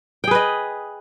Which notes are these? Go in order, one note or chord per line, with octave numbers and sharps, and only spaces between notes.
G#4 B4 D#5 G5